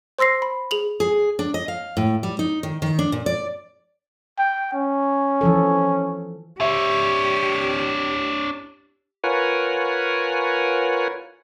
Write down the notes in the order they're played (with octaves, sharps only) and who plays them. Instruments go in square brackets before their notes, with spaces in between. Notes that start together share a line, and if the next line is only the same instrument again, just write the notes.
[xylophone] C5 C6 E6 A#6 C7
B5
G#4 F7 F#7
[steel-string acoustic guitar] G#4
D4
D#5
F5
A2
G3
D#4
D#3
D#3
D4
A#2
D5
[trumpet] G5
C#4
[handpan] E3 F3 A4
[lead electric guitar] D4 C#5 [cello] G4 [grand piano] E5
[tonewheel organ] F4 A#4 B4 C#5 F#5 G#5